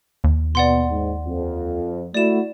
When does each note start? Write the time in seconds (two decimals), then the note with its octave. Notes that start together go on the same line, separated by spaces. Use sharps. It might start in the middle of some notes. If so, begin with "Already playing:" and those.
0.24 D#2
0.55 B2 B3 D5 F#5 C6
0.90 G#2
1.26 F2
2.14 A3 E4 F#4 D5 E7